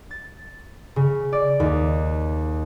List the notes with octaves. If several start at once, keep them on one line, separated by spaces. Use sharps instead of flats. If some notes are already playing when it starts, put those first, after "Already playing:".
A6
C#3
D5
D#2